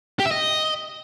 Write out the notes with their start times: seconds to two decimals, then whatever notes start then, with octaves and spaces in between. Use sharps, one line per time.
0.20 G4
0.25 E5
0.31 D#5